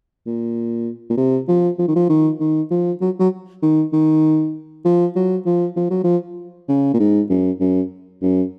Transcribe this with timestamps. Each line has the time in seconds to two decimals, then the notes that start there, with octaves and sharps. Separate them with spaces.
0.26 A#2
1.10 A#2
1.17 C3
1.48 F3
1.78 F3
1.87 D#3
1.96 F3
2.09 D#3
2.40 D#3
2.70 F3
3.01 F#3
3.19 F#3
3.62 D#3
3.93 D#3
4.85 F3
5.16 F#3
5.46 F3
5.76 F3
5.90 F#3
6.04 F3
6.68 C#3
6.94 A#2
7.00 G#2
7.30 F#2
7.60 F#2
8.22 F#2